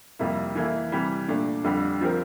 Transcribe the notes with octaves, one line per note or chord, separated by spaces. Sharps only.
F2 C3 G3 A#3 E4
E3 A#3 E4 A4
C3 E3 G3
A#2 A3 D4
F2 D3 G3
F3 C4 G4 A#4